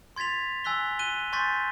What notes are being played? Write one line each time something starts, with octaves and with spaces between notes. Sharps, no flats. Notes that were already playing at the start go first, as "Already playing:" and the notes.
C6 G#6 A6 B6 F7
G#5 E6 F#6 B6 G7
F#6 D#7 G7
G#5 C6 C#6 G6 A6 B6